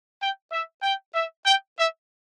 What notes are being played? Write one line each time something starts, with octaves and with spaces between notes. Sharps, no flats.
G5
E5
G5
E5
G5
E5